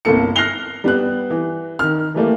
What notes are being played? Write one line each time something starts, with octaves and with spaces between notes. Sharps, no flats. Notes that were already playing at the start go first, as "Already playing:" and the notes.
G1 C2 A#3 A4 C#7
F6 F#6 A#6 C7 F7 G7
G3 B3 F#6
E3
D#3 F6
E3 G3 A3 A#3